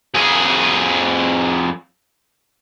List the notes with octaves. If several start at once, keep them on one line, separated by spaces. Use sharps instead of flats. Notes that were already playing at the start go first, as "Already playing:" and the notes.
F2 G#4